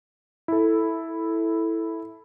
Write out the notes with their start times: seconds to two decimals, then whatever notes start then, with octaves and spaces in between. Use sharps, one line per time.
0.48 E4 A4